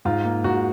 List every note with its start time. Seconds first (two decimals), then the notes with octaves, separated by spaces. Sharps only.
0.05 G#2 F4
0.25 A#3
0.44 G#2 F#4